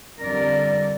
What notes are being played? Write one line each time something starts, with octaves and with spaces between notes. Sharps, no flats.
F2 D3 G3 A#4 D5